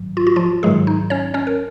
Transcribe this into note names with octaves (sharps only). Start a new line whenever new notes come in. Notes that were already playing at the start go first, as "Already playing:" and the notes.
Already playing: G#2 D#3 F#3
F4
F#4
F3 F4
G#2 D#3 F#3 G#3 G#4
D#4
C#4 C#5
C#4 C#5
A#4